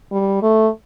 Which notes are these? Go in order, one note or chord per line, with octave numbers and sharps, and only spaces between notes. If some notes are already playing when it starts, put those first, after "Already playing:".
G3
A3